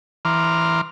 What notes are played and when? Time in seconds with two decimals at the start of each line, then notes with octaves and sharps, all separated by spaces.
0.25 E3 A#5 C6 D6 F6